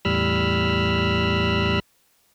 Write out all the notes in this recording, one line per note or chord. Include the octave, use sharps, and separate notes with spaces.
E2 A2 G3 B5 E6 F6